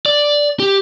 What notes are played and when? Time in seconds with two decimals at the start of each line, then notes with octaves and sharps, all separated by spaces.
0.06 D5
0.60 G4